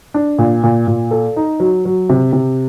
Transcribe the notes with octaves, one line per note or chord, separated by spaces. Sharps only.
D4
A#2
A#2
A#2
A4
D#4
F#3
F#3
C3
C3